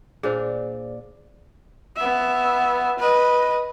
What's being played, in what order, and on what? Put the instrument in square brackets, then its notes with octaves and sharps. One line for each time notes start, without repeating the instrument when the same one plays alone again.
[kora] A#2 D4 [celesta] G#4 C5
[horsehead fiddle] B3 E5
B4 D#5